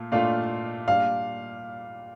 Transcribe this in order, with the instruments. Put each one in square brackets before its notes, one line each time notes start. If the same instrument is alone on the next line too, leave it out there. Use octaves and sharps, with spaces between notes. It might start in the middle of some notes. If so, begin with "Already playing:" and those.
Already playing: [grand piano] A#2 A3 F4
[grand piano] A#2 A3 D4 F4 [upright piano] F5
[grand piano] A#2 G3 D4 [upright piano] F5